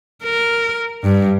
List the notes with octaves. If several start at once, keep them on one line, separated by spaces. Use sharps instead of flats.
A#4
G2